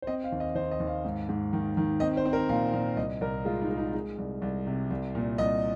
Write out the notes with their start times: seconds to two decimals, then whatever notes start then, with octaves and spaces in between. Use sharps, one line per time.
0.02 C5
0.07 C4 D#5
0.24 F5
0.32 D#2
0.40 D#5
0.55 D#2 C5
0.71 D#5
0.80 D#2
0.87 F5
1.05 G#2
1.29 G#2
1.53 D#3
1.77 D#3
2.00 C4 D#5
2.17 C5
2.25 C4
2.33 A#4
2.49 A#2 F5
2.73 A#2
2.97 C2 D#5
3.21 C2 A#4
3.45 G#3 F4
3.62 D#4
3.70 G#3
3.78 D#4
3.94 G#3
4.18 C2
4.42 C2
4.67 C3
4.90 C2
5.15 A#2
5.38 C2 D#5